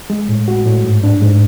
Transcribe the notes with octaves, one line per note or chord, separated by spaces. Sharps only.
G#3
A2
F#4
A2
G#2
D4
G#2